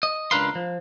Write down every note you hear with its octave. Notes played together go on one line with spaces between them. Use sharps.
D#5
C#2 D4 A#4 B4 F5 C6
F3